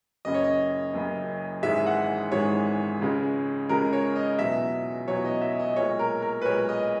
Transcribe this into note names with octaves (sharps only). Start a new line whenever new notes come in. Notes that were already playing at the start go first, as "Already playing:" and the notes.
F#1 F#2 C#3 D#5
C#5
D#5
F#1 F#2 C#3
G#1 G#2 E3 G#3 E5
F#5
G#1 G#2 E3 G#3 C#5
C#2 C#3 G#3
C#2 C#3 G#3 A#4
C#5
D#5
E2 B2 F#3 E5
E2 B2 F#3 C#5
D#5
E5
D#5
B1 A#2 G#3 C#5
A#4
A#4
B4
B1 A#2 G#3 C#5
D#5